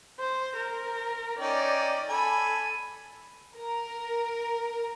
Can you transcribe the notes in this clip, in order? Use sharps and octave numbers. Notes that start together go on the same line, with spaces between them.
C5
A#4
C#4 D#4 D5 G5
A4 G#5 A5 B5
A#4